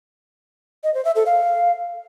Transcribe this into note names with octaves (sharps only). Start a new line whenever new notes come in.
D#5
C5
E5
A4
F5